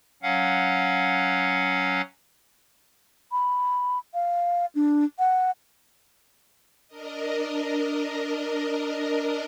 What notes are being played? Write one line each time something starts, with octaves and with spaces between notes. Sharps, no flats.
F#3 C#4 F5 F#5
B5
F5
D4
F#5
D4 A#4 D#5